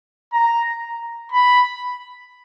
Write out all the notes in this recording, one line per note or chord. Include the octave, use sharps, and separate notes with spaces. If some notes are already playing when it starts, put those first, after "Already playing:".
A#5
B5